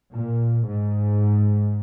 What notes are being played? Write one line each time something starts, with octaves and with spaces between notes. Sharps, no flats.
A#2
G#2